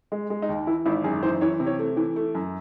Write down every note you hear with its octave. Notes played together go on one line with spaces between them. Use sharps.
G#3
G#3
D#4
D#2
E3 E4
G#1 E4
F#2 G#4
E3 C5
E3 C#5
C3
C#5
A3
E3
A3
F#2